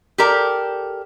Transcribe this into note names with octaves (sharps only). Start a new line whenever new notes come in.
G4 A4 A#4 D5